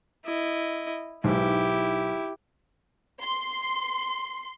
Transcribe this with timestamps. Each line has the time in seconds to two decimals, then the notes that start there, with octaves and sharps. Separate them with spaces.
0.25 E4 D#5
1.24 B1 G#2 E4 G4
3.22 C6